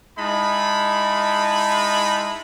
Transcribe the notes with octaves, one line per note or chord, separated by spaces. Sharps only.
G#3 D#4 E4 A5 B5